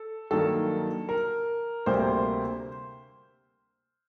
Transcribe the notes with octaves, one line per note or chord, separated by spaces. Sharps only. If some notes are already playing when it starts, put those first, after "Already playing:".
Already playing: A4
G2 D#3 F#3 A#3 A4
A#4
D2 C3 G3 A#3 C5